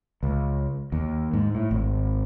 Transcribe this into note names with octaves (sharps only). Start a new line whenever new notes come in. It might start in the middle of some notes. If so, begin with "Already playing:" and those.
C#2
D#2
G#2
A2
G#1